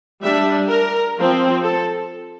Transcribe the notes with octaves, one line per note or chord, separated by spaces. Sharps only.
G3 D4 E5
A#4
F3 C4
A4